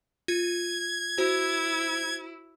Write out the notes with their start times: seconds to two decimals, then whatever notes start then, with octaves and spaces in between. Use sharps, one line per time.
0.28 F4 G#6
1.18 E4 F#4 C5